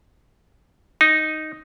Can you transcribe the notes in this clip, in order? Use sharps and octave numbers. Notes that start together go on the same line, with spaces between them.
D#4